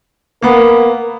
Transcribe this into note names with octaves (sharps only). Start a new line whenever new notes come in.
A#3 B3 A#4 F5 F#5 B5